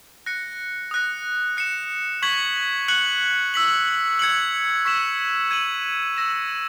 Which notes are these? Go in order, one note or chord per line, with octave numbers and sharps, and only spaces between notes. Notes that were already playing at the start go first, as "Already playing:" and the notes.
F#6 A#6 C#7
D#6 F#6 A#6
F#6 C#7 E7
C#6 G#6 B6 F#7
F#6 C#7 F#7
E6 B6 F#7
G#6 C#7 F#7
C#6 E6 B6 E7
G#6 D#7 F#7
E6 A#6 E7